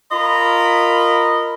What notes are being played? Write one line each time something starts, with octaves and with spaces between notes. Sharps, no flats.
F4 A#4 D#5 B5